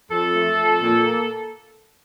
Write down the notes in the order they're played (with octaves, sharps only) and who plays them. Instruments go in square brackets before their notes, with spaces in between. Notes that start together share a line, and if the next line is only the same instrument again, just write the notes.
[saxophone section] F2 A4
A3
F2
A#2
A#3